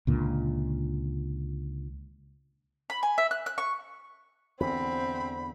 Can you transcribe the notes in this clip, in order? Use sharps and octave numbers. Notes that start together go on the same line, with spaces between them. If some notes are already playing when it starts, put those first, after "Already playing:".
C#2 A#2 D3
B5
G#5
E5
F#6
F#6
C#6
E2 D3 C4 B5